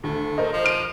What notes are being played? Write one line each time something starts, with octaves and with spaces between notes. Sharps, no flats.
D2 A3
A#4 C5 D#5
F3
F6 D#7